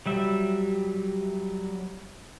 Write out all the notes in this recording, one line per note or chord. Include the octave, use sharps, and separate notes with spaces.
F#3 G3 E5